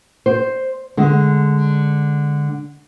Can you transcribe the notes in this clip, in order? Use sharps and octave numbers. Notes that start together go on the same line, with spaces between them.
C5
D3 G#3